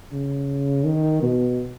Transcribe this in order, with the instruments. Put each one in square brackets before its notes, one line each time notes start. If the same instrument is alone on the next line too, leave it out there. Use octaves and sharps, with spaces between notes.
[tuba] C#3
D#3
B2